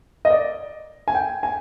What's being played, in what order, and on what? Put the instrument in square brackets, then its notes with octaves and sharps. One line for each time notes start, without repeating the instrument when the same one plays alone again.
[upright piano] D#5
D5
G#5
G5
G#5